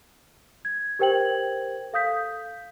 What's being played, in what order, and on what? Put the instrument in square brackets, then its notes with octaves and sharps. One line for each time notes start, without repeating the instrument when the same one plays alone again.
[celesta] G#6
G4 A#4 C5 G5 G#6 F#7
A4 F5 D#6 G6 B6